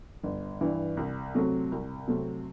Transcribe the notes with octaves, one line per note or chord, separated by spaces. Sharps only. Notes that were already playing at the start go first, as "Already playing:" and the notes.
G1
G2 E3
C2
C3 F#3 A3 C4
C2
C3 F#3 A3 C4